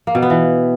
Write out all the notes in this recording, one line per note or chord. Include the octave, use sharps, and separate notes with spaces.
A#3
B2
B3
E3